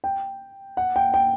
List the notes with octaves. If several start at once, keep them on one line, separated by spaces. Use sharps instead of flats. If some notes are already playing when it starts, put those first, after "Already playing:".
G5
F#5
G5
G5